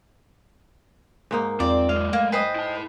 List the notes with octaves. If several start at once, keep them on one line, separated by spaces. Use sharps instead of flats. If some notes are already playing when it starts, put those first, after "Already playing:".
G#2 A#3 D#4
E2 C4 F4 D5
F#3 G#3 F5
A3 A#3
B4 C5 D#5 G5 G#5 C7
E4 A5